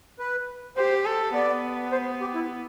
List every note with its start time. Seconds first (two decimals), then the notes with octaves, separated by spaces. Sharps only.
0.19 B4
0.77 G4 C5
1.05 A4
1.34 B3 D5
1.92 C5
2.21 G4
2.35 E4